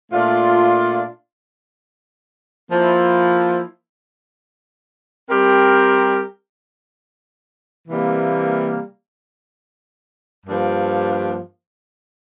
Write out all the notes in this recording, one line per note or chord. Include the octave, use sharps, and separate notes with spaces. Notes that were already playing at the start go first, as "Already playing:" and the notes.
A#2 A3 D4 F4
F3 A#3 E4
G3 C4 G4 A#4
C3 E3 G3 A#3
G2 F3 A#3 D4